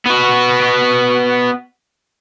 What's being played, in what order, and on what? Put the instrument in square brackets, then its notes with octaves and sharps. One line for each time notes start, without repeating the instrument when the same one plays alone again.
[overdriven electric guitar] B3 F#4